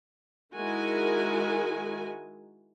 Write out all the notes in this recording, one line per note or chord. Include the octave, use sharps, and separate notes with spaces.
D#3 G#3 E4 F#4 A#4 G#5